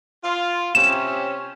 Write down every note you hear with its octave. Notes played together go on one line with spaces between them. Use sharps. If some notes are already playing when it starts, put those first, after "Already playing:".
F4
C3 C#4 E7